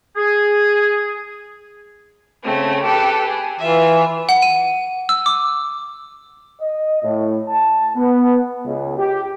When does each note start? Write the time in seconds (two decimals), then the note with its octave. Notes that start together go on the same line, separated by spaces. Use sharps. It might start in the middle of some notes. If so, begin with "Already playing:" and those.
0.17 G#4
2.44 C#3 A3 C4
2.83 G4 A4 B4
3.29 G#4
3.60 E3 F4 E5
4.29 F#5
4.42 D#7
5.09 E6
5.26 D6
6.60 D#5
7.03 A2
7.47 A5
7.96 B3
8.65 C#2
8.99 G4